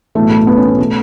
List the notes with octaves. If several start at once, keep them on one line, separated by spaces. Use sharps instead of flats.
B1 A2 E3 A3
A3
B3
C#4
B3
B2 A3